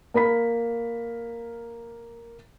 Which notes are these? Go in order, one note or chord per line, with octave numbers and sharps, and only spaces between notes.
A#3 A#4 B5 B6